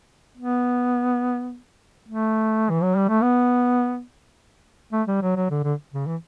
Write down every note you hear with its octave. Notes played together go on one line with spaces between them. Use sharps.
B3
A3
E3
F#3
G3
A3
B3
A3
G3
F#3
F#3
D3
D3
C#3
E3